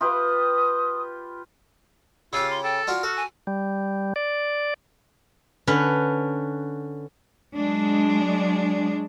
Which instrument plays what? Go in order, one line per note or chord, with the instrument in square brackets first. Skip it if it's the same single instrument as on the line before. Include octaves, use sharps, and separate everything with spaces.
[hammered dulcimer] F4 G4 B4 [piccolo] D#6
[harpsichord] C#3 G4 [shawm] F4 [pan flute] E6
[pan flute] C6
[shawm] A4 [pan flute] G5
[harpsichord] D4 F4 F#4 [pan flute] F6
[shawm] F#4 [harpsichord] A4
[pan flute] G#5
[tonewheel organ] G3
D5
[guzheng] D3 C#4 B4
[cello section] F#3 G#3 D4